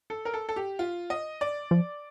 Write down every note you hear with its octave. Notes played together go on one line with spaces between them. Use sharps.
A4
A#4
A4
A4
G4
F4
D#5
D5
F3